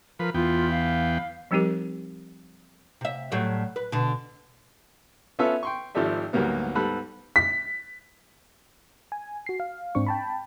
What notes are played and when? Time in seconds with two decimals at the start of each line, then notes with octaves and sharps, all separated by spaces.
0.19 F3 A#4 B4
0.34 E2 B3 F4 G5
0.70 F5
1.51 F3 G3 C4 D#4 G4 A#4
3.01 C3 E5
3.32 A2 F#3 G3
3.76 B4
3.92 B2 D3
5.39 B3 C#4 F4 A4 B4 E5
5.63 G5 C6 C#6
5.95 G#1 F3 G4 A4 D5 E5
6.33 D2 G#2 F#3 G3 A#3 B3
6.75 G#2 G3 B3 A4 B5 F#6
7.36 B6
9.12 G#5
9.46 F#4 C7
9.60 F5
9.95 G#2 C4 D4 C#6
10.06 G5 A5 B5